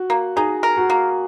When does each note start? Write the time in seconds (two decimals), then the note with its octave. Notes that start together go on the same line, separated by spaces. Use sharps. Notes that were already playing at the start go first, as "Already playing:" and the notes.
Already playing: F#4
0.10 A#3
0.36 D#4 G#4
0.63 A#4
0.77 F#4
0.90 A#3